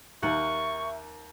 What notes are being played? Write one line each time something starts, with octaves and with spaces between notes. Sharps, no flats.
D#2 A#4 E5 F#5 C#6